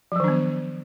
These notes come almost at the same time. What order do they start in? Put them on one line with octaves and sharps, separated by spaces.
F3 F#3 D#3 D4 B3